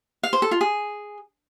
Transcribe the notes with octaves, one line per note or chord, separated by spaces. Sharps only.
F5
C5
A4
F4
G#4